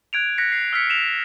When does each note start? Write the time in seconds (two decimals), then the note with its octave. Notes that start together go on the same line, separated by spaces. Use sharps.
0.13 F#6 G#6 D7 F7
0.38 F#6 A#6 B6 C#7
0.52 C7
0.73 E6 F6 G#6 B6 C#7
0.90 E7 F7
1.09 B6